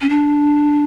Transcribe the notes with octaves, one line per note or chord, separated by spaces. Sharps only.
C#4
D4